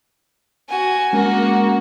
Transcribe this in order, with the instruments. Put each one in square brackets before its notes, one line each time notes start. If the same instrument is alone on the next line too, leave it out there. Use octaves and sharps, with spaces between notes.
[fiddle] F#4 G#5
[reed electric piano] G#3 C#4 [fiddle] A#3 F#4